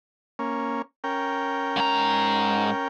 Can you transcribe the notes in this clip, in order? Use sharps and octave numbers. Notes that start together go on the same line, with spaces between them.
A#3 C#4
C#4 A#4 G5
G#2 A#5